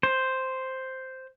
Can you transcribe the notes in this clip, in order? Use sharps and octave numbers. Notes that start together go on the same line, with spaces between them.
C5